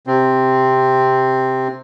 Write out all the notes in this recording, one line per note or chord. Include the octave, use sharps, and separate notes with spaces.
C3 C4